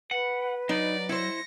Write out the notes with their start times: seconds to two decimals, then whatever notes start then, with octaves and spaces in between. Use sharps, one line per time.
0.11 B4 F#5
0.69 F#3 D#4 D5
1.09 E4 C5 A#6 C#7